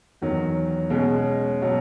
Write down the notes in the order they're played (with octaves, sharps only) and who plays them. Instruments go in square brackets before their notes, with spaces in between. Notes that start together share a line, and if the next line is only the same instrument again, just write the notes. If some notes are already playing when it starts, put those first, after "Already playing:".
[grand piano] E2 D#3 F#3
B2 G#3 C#4
B2 F#3